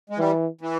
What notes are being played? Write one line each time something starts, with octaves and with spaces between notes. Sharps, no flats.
G#3
E3 G3
E3